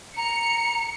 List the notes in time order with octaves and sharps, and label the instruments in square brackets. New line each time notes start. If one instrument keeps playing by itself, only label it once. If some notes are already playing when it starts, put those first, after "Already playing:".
[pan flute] A#5 [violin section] C#7